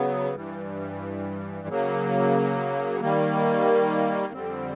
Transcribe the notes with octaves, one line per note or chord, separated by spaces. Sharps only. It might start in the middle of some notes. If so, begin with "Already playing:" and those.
Already playing: C#3 F#3 B3
G2 E3 G3
C#3 F#3 A#3
D#3 G3 A#3
F2 D3 G3 C4